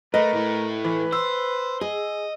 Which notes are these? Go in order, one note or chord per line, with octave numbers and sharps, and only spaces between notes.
A3 A#4 B4 D#5
A2 A3
E3 B4
C5 E6
G#4 D#5